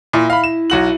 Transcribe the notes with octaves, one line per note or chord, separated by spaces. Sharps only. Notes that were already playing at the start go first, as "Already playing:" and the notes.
A#2 E4
F5 B5
E7
B1 F#4 F#7